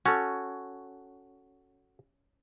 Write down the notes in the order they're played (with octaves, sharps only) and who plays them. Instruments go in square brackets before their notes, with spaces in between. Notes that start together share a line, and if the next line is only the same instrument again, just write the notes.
[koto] C#4 [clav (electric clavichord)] F#4 A4